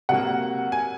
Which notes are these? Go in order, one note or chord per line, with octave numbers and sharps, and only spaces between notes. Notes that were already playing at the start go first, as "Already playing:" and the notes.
C3 F#3 A#3 F#5
G#5